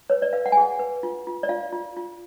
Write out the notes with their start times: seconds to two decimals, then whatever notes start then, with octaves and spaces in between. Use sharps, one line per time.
0.10 B4 C#5
0.22 D5
0.33 B4 F5
0.46 F#5
0.52 G#5
0.57 G#4 F#5
0.79 B4
1.03 F4
1.27 F4
1.43 D5
1.49 F4 F5
1.73 F4
1.97 F4